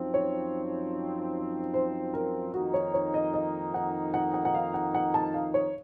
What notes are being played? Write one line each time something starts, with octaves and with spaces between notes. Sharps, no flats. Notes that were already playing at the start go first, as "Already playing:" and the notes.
Already playing: F#2 F3 C4 D#4
C#5
C5
A#4
F2 D#3 A#3 D#4 F#4
C#5
C#5
D#5
D#5
F#5
F#5
F#5
F#5
F5
F#5
F#5
A5
F5
C#5